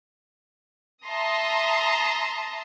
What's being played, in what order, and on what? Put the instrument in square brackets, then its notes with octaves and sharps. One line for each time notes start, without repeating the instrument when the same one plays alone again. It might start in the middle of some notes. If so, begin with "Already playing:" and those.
[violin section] E5 A5 A#5 C6 D#6